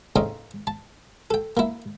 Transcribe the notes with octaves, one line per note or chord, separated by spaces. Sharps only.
A2 C#3 C4 D#4
A5
A4 G5
A#3 E4